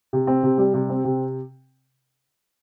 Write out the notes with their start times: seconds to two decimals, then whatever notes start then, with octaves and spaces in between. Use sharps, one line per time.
0.13 C3
0.27 C4
0.43 C3
0.58 G3
0.74 C3
0.89 C4
1.04 C3